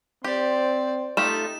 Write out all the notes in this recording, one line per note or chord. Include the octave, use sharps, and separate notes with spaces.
C4 G4 C5 D5
A3 D#4 F4 G4 E7